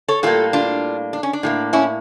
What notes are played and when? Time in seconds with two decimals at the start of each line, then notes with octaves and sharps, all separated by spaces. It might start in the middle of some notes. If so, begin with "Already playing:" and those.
0.08 A4 C#5
0.23 A2 G3 A#3 F4 A4
0.53 D4 F4
1.13 D4
1.23 C#4
1.33 D4
1.43 A2 G3 A#3
1.73 C#4 E4